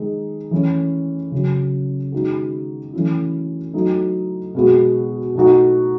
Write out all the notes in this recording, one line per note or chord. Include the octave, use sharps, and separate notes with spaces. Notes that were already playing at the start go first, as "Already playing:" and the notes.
Already playing: D#3 G#3 D#4
E3 A3 C#4
C#3 F#3 C#4
D#3 G#3 D#4 F#4
E3 A3 C#4 E4
F#3 A3 D#4
B2 G#3 B3 F#4
B2 A3 D#4 F#4